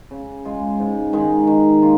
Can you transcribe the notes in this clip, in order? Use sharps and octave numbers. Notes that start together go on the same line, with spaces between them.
C#3
G#3 F4
G#2
D#3 G#3 D#4
D#3
A#3 F4